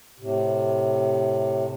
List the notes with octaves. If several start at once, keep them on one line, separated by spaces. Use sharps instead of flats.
A2 C3